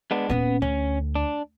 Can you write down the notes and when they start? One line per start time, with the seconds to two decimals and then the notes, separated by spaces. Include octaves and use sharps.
0.11 G#3 B3 D4
0.30 D#1 B3 C#4
0.62 D2 C#4
1.15 D4